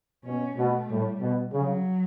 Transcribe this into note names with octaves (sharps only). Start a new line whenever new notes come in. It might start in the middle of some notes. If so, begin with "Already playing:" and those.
B2 C#4
B2 A3
A2 G3
B2
C#3 F#3